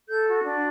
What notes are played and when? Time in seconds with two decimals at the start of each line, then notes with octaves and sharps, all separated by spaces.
0.08 A4 G6
0.27 F#4
0.44 D4